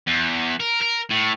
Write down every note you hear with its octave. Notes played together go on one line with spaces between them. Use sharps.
E2
A#4
A#4
A2